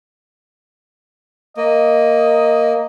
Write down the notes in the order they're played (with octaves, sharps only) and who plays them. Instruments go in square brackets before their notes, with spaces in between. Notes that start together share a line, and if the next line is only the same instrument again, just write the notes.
[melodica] A#3 [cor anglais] D#5